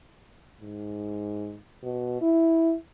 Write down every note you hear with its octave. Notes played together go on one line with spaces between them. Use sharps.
G#2
B2
E4